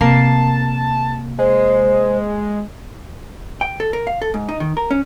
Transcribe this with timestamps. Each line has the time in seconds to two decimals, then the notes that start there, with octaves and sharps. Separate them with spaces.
0.01 C3 A#3 A5 C7
1.39 G#3 C5
3.61 G5
3.80 A4
3.93 A#4
4.07 F5
4.22 A4
4.34 G#2
4.49 D#4
4.60 D#3
4.77 A#4
4.91 C#4